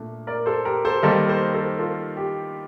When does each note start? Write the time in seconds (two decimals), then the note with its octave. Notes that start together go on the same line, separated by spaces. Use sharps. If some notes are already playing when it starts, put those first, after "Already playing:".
Already playing: A#2 A3 D4
0.27 A#4 D5
0.46 A4 C5
0.65 G4 A#4
0.85 A4 C5
1.03 D#3 G3 A#3 D#4 A4 C5
1.29 A4 C5
1.53 A4 C5
1.79 F4 A4
2.17 G4